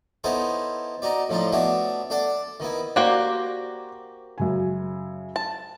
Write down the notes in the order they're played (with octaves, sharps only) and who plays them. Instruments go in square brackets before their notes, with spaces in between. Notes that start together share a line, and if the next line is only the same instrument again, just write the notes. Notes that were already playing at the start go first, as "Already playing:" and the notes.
[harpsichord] B3 D#4 E4 A4 C5 C#5
D#4 F#4 D5
A2 F3 D4 D#4
A3 B3 D4 F#4 C#5 E5
D4 A4 D5 F#5
D#3 B3 E4
[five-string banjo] A#3 F#4 G4 [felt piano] C5 D5
[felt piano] F#2 C#3 G#5
[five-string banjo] A5